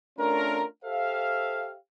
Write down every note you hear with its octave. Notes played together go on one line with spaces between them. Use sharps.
A3 C#4 D4 F4 A#4
G4 A4 C5 E5 F5